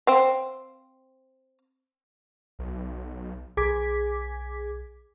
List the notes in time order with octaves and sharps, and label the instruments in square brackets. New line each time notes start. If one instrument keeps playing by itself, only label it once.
[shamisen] C4 F5
[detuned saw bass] B1
[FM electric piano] B1 G#4 G#5 D6 G#6 B6